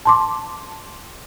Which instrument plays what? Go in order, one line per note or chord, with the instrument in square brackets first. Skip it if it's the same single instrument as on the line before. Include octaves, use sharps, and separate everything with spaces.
[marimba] A5 C6 D6